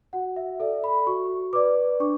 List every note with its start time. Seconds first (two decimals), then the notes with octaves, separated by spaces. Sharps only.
0.13 F#4 F#5
0.36 E5
0.60 A4 D5 E5
0.84 B5
1.07 F#4 C#6
1.53 B4 D5 D6
2.00 D4 C#6